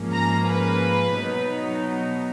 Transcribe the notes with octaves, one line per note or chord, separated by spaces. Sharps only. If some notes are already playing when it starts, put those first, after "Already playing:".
Already playing: G#2 F3 A#3 C#4
A#5
B4
B2 F#3 B3 D#4